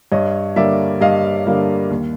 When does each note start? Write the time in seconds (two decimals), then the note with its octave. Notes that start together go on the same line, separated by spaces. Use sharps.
0.12 G2 C#5 D#5
0.56 D3 G3 A#3 D5 E5
1.01 G2 D#5 F5
1.47 D3 G3 A#3
1.91 D#2